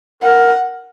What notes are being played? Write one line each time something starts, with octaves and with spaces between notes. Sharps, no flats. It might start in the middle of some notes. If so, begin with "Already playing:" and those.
A#4 F#5